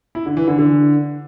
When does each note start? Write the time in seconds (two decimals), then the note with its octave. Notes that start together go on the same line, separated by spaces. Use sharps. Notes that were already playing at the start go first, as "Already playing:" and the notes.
0.15 E4
0.26 D3
0.37 E3
0.48 D3
0.58 D3